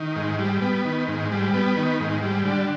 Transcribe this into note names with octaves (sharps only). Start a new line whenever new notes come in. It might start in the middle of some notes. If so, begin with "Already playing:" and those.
Already playing: D#3
G#2
G3
B3
D#3
G#2
G3
B3
D#3
G#2
G3
D3